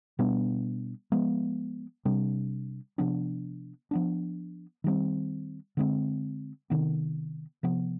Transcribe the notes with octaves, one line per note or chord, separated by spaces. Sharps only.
B2 G3 B3 D4
F3 G#3 B3
C3 G3 D4
C3 F3 B3 D4
F3 B3 D4
D#3 G3 C4
D3 G#3 C4
C3 D#3 B3
C3 F3 B3